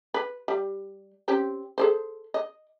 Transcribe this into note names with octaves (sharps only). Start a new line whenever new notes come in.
B4
G3
C4 C#4 G4
G#4 A4 C5
D#5